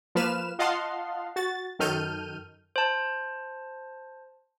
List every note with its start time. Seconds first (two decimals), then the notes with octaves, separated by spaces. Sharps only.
0.15 F3 A#3 B4 F6 E7
0.59 F4 D#5 F5 F#5 A5 C6
1.36 F#4 A6
1.79 F#2 D#3 A4 F6 G6 D#7
2.76 C5 A5